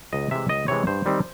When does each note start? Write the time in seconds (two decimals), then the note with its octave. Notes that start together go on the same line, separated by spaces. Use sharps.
0.13 C#2 D#5
0.31 C3 E3 G#3 E5
0.49 C#2 D#5
0.68 C3 E3 G#3 C#5
0.87 G2 C5
1.05 D#3 G3 C4 D#4